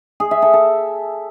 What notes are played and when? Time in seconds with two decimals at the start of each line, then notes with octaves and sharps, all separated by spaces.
0.20 G#4
0.31 E5
0.42 A4
0.53 A4